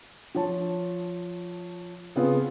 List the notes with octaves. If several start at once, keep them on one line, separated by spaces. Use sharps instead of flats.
F3 C#5 A5
C#3 B3 C4 F4 G#4 B4